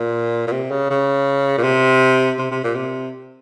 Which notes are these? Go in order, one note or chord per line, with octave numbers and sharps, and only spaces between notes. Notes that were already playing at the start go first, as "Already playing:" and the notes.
Already playing: A#2
A#2
C3
C#3
C#3
A#2
C3
C3
C3
A#2
C3